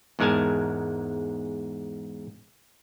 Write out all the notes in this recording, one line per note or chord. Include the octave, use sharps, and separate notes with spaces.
E2 G#2 G#3 A#4 G#5 A5